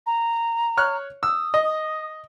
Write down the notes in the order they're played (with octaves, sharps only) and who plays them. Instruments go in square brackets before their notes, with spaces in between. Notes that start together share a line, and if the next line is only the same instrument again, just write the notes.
[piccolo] A#5
[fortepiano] C#5 F6 F#6
[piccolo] D#6 [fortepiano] E6
[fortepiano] D#5